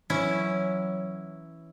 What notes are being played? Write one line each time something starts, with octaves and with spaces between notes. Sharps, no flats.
E3 F#3 C#4 E4